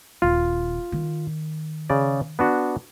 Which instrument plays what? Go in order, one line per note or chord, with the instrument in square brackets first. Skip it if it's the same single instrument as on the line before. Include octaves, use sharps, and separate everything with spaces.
[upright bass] D#1 C4 [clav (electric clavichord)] F4
[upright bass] D#3
[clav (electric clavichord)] C#3 D5
B3 D4 F#4